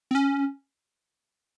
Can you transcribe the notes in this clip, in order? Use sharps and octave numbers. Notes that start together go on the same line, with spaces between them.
C4
C#4